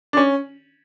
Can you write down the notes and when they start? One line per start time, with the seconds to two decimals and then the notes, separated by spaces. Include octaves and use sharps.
0.13 D4
0.17 C#4